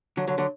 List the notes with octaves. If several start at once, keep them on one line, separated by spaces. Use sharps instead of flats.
D3 F#3
D3 F#3
D3 F#3